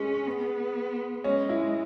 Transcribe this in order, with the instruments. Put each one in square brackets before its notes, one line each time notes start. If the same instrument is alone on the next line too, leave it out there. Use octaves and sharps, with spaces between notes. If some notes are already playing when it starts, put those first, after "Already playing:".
Already playing: [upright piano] G#3 [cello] C#4
[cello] B3
[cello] G#3 [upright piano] C#4
[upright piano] E4